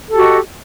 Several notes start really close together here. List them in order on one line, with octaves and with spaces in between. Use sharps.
A4 G4 F#4 D#5